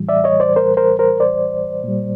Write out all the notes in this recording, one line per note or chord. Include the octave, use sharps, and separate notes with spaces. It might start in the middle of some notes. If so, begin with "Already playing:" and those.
Already playing: A2 E3 G3
D5 E5
C#5 D#5
C5 D5
A#4 C5
A#4 C5
A#4 C5
C5 D5
A#2 G3